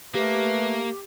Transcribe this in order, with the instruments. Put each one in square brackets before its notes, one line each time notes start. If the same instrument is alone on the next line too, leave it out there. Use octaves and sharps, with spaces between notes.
[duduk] A3 [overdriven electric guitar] A#3 [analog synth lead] G4 [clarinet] B4